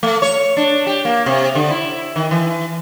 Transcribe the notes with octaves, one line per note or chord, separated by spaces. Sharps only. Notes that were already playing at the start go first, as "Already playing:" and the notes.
A3
C#5
D4
G4
A#3
C3
D3
E4
D#3
E3